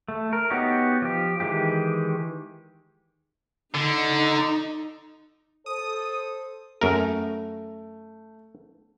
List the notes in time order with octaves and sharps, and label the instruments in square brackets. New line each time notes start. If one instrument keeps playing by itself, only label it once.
[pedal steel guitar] A3
A#4
B3 D#4 F#4 G4 C#5
F3 G4
D#3 E3 G#3 G4
[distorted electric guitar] D3 [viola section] D#4
[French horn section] A4 C5 [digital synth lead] D#6
[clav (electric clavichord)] F#2 A#4 [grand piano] A3